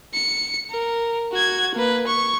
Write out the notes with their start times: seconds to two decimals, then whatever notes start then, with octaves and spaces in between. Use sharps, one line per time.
0.14 C#7
0.70 A#4
1.32 F#4 G#6
1.75 A#3 B4
2.07 C#6